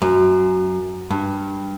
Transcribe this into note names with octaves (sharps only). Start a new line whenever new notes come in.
F#2
G2